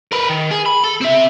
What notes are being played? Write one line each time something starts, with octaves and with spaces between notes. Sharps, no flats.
A#4 B4
D#3
G#4
B5
A4
C4 E5